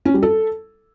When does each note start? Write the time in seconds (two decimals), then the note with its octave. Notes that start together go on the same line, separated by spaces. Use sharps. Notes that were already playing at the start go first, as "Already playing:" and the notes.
0.05 C#4
0.14 G3
0.23 A4